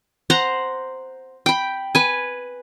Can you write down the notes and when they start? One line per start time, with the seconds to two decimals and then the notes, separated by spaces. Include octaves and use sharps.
0.30 C5 F#5 A#5
1.46 G5 B5
1.95 B4 G#5